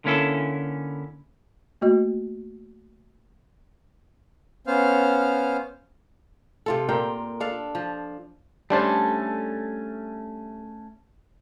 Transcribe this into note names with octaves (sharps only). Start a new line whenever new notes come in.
D3 A#3 C#4 E4 A4
A3 A#3 F#4 D#5
B3 C#4 C5 F5 F6
C3 F4 A4
A#2 A#4 F5 G5
D4 A4 F5
F3
G3 A3 C#4 D4 A4 C5